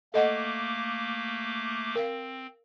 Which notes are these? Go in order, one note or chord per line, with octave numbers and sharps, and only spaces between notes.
A3 A#3 A4 D#5 F#5 D6
C4 A#4 F5